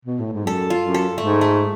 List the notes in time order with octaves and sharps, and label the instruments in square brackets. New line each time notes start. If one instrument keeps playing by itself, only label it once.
[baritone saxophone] B2
A2
G#2
[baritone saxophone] F#2 [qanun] A4
[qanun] F4
[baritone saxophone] F#2
[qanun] A4
[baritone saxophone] G#2 [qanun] A3
[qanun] A3